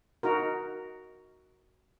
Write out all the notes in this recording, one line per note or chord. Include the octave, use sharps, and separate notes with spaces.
D#4 F#4 A#4